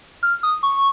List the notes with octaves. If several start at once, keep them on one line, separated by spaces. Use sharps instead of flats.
F6
D#6
C#6